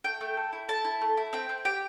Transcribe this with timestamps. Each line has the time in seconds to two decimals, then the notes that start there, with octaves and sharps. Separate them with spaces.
0.04 A3 G5
0.21 A3
0.37 A4
0.53 E4
0.68 A4 A5
0.85 E4
1.01 A3
1.17 E4
1.33 C4 G5
1.49 C4
1.65 G4 G5